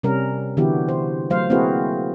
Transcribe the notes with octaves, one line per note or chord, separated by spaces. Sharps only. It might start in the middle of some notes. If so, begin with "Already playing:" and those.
C3 G3 C#4 A#4
D3 E3 B3 E4 F#4 G4
C5
F#3 A3 C5 F5
A#3 C4 E4 F#4 G#4 B4